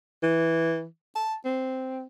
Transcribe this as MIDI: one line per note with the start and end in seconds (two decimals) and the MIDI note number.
0.23 0.85 52
1.16 1.35 81
1.45 2.05 60